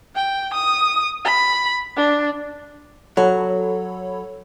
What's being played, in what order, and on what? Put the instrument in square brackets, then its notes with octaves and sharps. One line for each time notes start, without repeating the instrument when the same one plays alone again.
[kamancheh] G5
D#6
B5
D4
[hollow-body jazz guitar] F#3 [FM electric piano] A4 C#5 B5